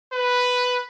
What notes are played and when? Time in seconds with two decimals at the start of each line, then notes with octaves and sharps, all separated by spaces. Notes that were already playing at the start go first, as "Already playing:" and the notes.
0.13 B4